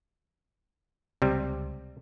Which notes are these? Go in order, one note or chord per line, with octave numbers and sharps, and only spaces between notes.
C#2 C3 G3